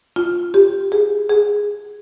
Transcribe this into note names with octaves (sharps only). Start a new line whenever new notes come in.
F4
G4
G#4
G#4